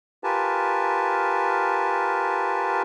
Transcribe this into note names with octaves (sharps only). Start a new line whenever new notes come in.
F4 G4 A#4 B4 G#5 A5